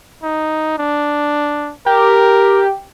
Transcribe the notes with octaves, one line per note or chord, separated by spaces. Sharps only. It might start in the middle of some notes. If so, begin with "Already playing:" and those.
D#4
D4
G4 A#4